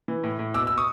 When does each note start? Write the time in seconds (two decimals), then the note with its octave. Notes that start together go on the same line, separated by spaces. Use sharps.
0.08 E3
0.24 A2
0.39 A2
0.54 B2 D6 E6
0.67 B2 E6
0.78 C#6 D#6